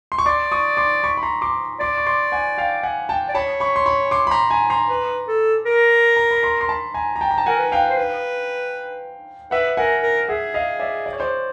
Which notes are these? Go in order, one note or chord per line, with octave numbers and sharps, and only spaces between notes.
C6
C#6
D5 C6 D6
C#6 D#6
C6 D6
B5 C#6
B5
A#5 C6
C6 D6
D5 C6 D6
C#6
C6 D6
F#5 G#5
F5 G5
F#5 G#5
G5 A5
D5
C#5 A5 B5
B5 C#6
C6
B5 C#6
C6 D6
B5
A#5 C6
G#5 A#5
A#5 C6
B4
A4
A#4
A#5
B5
A#5 C6
C6
A5 B5
G#5 A#5
A#5
G5 A5
A#5
A5
A#4 F#5 G#5
B4
F5 G5
C5
B4
B4 E5 F#5
A#4 F#5 G#5
A#4
G#4 E5 F#5
D#5 F5
D5 E5
D5
C#5
C5 D5